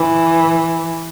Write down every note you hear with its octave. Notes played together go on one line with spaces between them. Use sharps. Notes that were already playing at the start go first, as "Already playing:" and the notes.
Already playing: E3